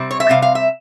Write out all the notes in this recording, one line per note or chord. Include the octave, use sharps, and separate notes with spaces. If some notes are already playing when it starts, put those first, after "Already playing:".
Already playing: C3 G3 C4
C#5
E5
C3 G3 C4 F5
F5
E5